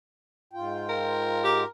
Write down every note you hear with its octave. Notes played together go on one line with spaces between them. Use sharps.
G#2 F4 G5
A#4
G4